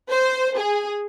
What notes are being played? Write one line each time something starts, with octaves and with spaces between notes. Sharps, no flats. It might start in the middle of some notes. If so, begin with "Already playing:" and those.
C5
G#4